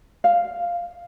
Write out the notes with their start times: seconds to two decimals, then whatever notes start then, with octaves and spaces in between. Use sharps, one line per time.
0.24 F5